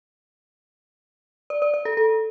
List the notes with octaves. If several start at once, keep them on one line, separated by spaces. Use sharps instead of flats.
D5
D5
D5
A4
A4